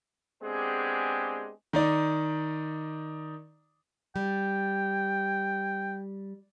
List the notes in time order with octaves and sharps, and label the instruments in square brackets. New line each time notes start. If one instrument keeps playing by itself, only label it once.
[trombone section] G#3 B3 C4 D4 G4 G#4
[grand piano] D#3 D#4 D5
[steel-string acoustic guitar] G3 [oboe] G5